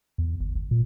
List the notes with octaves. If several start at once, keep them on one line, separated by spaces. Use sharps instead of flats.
E2
G1
G1
A#2